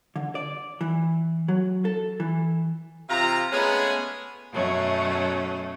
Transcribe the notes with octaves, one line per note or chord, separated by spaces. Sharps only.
D3
D5
E3
F#3
A4
E3
C3 F4 A#5
G#3 A3 B3 C#4 G#4 B4
F#2 B2 F#3 A3 C#4